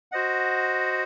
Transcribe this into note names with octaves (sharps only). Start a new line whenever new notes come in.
F#4 C5 D#5 F#5